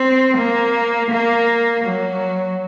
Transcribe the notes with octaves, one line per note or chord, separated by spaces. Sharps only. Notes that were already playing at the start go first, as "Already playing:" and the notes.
Already playing: C4
A#3
A#3
F#3